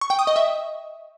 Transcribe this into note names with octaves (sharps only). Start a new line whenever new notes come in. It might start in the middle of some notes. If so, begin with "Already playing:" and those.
C#6
G5
D#6
D#5
E5